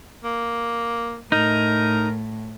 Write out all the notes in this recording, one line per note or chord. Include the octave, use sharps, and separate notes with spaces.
A#3
A2 D#4 A#4